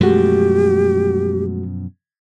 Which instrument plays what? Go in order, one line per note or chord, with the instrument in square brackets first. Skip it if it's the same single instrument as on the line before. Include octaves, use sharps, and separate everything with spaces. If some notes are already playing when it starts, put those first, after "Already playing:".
[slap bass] F#2 B2 F3 [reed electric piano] G#3 A3 F#4 [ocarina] G4